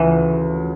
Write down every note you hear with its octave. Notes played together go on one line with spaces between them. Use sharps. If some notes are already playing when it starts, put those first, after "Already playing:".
Already playing: D2 C#3 E3 F3